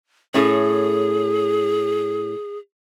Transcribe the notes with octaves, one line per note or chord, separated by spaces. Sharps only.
A2 C#4 G#4